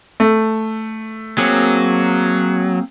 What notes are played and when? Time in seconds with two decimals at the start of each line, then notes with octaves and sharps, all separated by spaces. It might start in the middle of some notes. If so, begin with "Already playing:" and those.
0.20 A3
1.38 F#3 A#3 C4 G#4